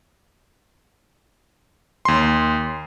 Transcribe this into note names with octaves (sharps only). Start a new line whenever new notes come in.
D#2 C6